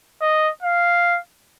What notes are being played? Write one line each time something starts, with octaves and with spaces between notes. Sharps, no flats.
D#5
F5